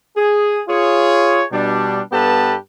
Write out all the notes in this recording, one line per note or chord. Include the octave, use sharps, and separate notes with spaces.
G#4
F4 G#4 C#5
B2 G3 D4
G2 B3 G4 A4 B4 A5